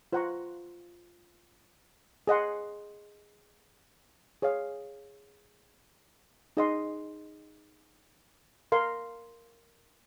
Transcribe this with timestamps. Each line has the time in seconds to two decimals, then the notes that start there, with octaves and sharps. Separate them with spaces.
0.12 F4 C5 F#5 A#5 C#6
2.27 G#4 D#5 F#5 C6
4.42 G#4 C#5 F5
6.57 D#4 G#4 D#5 F#5 C6
8.72 A#4 F5 C6